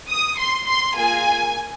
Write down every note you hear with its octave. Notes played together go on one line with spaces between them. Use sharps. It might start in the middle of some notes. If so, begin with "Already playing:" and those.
D#6
C6
C6
A#3 F4 G#4 G#5